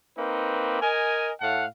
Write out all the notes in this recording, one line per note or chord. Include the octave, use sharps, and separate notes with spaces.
A#3 C4 D#4 B4
A#4 D#5 G#5
A2 F5 F#5 A5